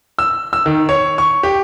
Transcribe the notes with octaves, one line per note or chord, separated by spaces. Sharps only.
E6
E6
D#3
C#5
C#6
G4